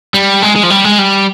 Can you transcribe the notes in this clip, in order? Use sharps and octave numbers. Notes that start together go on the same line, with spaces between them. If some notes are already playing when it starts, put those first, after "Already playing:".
G3
G#3
G#3
F3
G3
G#3
G3